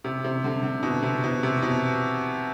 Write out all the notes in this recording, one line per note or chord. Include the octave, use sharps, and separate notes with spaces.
C3
C3
D3
D3
B2
C3
B2
C3
B2